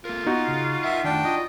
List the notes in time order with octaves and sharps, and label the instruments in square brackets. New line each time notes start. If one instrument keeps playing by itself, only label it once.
[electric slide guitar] A#3 A4 A#4 [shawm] F4
[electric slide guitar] B3 [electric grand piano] D#4 F#4
[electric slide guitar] C#3
[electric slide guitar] A#4 D#5 F#5 [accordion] E5
[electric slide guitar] D#3 A3 [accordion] D4 G5
[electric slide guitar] F4 [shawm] D#5